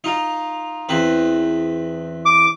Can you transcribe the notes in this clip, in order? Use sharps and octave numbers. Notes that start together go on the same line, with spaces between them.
D#4 F4
E2 C4 B4
D6